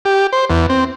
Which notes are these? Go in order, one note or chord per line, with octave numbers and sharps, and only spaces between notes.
G4
C5
E2
C4